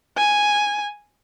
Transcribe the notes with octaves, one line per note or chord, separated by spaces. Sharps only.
G#5